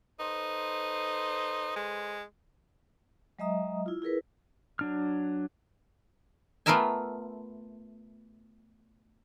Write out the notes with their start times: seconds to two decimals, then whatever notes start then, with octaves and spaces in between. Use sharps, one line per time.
0.19 D#4 A4 B4 C5
1.76 G#3
3.39 F#3 G#3 D#5 E5 A#5 D#6
3.86 E4 F4
4.02 E4 G#4 A#4 B4
4.79 F#3 D4 F6
6.66 A3 B3 F4 A#4 E5 G#5